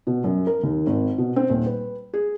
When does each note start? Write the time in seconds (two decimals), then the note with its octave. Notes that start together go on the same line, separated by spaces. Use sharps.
0.07 B2
0.24 F#2
0.47 A#4
0.63 D#2
0.86 G#1
1.18 B2
1.36 C4
1.50 D#1
1.66 B4
2.14 G#4